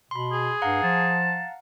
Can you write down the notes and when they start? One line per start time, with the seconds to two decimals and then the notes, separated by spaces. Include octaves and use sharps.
0.11 B2 B5 C6
0.32 G#4
0.62 G2 F5 F#5 A#5
0.83 F3 A5